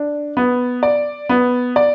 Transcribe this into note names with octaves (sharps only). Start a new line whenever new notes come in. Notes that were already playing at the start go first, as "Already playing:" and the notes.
Already playing: D4
B3
D5
B3
D5